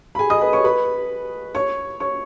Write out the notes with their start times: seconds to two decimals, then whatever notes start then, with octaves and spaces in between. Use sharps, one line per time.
0.15 B5
0.19 G#4 G#5
0.30 D#5 D#6
0.41 B4 B5
0.53 C#5 C#6
0.64 B4 B5
1.55 C#5 C#6
2.00 C#5 C#6